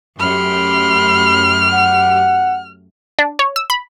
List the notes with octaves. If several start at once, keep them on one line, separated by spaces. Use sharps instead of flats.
F#2 A3 G4 B5 C6 F6
F#5
D4
C#5
E6
B5